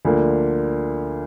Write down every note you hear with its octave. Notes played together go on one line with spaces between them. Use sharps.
D2 D3 F3 A#3